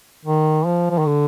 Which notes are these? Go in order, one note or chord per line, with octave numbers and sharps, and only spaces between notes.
D#3
F3
F3
D#3
D3